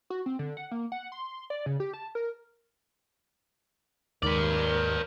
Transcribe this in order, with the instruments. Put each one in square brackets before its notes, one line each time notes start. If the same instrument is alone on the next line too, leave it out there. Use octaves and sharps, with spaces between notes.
[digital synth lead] F#4
C4
D3
F#5
A#3
F#5
C6
D5
C#3
G4
A5
A#4
[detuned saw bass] D#2 [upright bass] G#2 D#3 [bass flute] A#4 [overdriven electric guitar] B4 D5